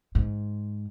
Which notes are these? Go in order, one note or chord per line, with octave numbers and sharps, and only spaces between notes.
G#2